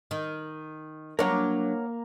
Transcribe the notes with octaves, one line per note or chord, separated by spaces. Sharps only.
D#3
F#3 A#3 D4 A#4 C#5 F#5 A#5